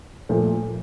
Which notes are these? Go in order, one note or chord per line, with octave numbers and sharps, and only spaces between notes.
A#2 F3 A3